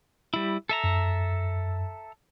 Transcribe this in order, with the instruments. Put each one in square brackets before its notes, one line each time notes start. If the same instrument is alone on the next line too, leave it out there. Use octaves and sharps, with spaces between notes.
[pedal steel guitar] G3 E4
A4 E5 A#5
[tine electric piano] F#2